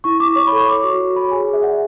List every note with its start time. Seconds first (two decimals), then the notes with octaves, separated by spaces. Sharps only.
0.04 E4 C#6
0.20 E4 D6
0.36 C#5 C#6
0.47 B5
0.52 A4 C#6
0.68 C#5 D6
0.84 F#4 C#6
1.00 F#4
1.16 C#5 B5
1.31 G#4 G#5
1.48 G#4
1.53 E5
1.63 D5 F#5